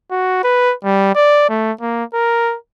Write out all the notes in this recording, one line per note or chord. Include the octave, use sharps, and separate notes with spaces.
F#4
B4
G3
D5
A3
A#3
A#4